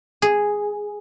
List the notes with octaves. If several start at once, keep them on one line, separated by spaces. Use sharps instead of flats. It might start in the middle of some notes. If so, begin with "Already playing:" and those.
G#4